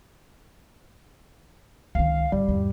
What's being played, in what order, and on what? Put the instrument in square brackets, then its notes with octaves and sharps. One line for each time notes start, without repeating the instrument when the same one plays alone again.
[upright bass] C#2 D#3 [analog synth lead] F5
[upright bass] A1 [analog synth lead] G3
[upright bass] E2 G#2